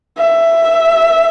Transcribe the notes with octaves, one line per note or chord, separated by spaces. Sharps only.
E5